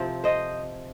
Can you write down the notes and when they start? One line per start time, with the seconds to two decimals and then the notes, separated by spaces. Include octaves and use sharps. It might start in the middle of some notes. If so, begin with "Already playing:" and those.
Already playing: C3 F3 C4
0.24 C5 D#5